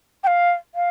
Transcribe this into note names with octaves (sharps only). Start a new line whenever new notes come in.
G5
F5
F5